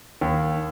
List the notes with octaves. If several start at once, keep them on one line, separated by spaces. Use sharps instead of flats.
D#2